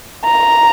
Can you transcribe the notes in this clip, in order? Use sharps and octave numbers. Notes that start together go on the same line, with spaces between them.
A#5